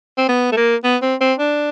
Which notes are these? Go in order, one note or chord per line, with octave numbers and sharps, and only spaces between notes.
C4
B3
A3
A#3
B3
C4
C4
D4